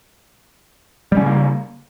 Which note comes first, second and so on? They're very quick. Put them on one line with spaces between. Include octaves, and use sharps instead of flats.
G3 C#4 C#3 A#3